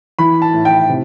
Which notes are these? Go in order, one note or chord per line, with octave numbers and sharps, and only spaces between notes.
E3 B5
A5
A2
G5
C3